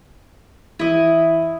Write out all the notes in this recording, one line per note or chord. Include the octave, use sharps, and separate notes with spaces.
E3 E4 D#5